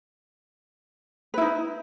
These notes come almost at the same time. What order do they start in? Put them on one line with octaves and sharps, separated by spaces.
B4 E4 D#4